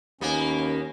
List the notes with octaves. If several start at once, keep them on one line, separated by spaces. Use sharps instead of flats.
D#2 A#3 B3 C#4